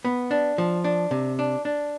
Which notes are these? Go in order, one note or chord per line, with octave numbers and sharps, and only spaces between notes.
B3
D4
F3
D4
C3
D4
D4